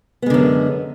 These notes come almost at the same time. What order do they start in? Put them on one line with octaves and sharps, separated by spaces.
B3 G#3 D3 F#2